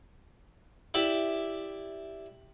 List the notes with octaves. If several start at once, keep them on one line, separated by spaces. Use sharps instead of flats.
E4 G4 D5 E5